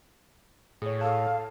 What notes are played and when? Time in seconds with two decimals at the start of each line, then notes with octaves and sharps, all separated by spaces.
0.82 A2 G#4 C#5
1.01 A4 F5 A5